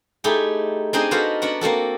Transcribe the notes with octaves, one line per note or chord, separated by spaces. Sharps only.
A3 D#4 E4 G4 G#4
C4 D4 D#4 G#4 C5 D#5
F#4 A4 B4 C5 F5
B3 D4 F#4 F#5
A#3 C4 F#4 A4